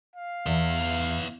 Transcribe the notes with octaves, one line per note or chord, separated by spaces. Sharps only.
F5
E2 B3 E5